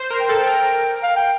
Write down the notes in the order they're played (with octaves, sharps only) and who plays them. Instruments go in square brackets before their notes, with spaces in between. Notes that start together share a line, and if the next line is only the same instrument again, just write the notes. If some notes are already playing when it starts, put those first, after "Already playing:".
Already playing: [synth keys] C5
A#4
[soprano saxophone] G5
[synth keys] A4
A#4
[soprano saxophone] F5
G5